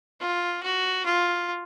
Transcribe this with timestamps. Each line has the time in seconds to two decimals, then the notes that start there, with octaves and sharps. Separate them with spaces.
0.21 F4
0.63 F#4
1.05 F4